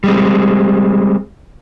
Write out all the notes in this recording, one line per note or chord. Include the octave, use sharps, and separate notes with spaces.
G3 G#3 C4